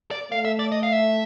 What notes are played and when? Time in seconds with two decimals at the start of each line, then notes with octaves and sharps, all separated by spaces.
0.11 D5
0.32 A3 F5
0.45 E5
0.59 D5
0.72 D#5
0.83 F5
0.92 E5